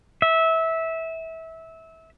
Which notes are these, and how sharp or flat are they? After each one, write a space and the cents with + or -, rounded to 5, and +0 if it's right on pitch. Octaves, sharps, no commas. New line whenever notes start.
E5 -20